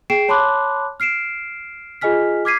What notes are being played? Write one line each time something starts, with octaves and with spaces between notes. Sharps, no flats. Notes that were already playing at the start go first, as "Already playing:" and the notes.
G#4 G5 C7 D7 E7
C#5 A5 B5 C6 D6 F#6
F6 C7 D7 E7
F4 G#4 D#5 G#5 F6 B6
D6 F6 G#6 B6 C7 D#7